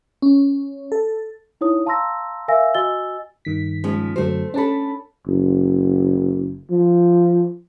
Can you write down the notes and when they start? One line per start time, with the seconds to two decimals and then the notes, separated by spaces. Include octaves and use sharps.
0.22 C#4
0.92 A4
1.61 D#4 E4 C#5 D#6
1.86 F5 A5 A#5 C6 E6 A#6
2.48 A#4 E5 F5 G#5 E6 A#6
2.75 F#4 D#5 G#5 E6 A6 G7
3.45 G2 D#3 B6
3.84 F3 G#3 C#4
4.16 F#2 D3 F#3 A3 C5
4.54 C#4 D4 A4 A5 B5
5.27 F#1
6.71 F3